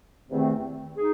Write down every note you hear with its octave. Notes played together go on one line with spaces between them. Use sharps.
E2 C3 D#3 A3 C4
D#4 G#4